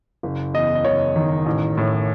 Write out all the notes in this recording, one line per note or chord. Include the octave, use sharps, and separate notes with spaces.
F#1
E2 D#5
D#5
F#1 C#5
D#3
A1
A2